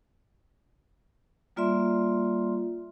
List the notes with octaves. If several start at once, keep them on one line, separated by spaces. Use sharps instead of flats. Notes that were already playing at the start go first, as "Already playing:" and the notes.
G3 A#3 F4 D5 E5 C6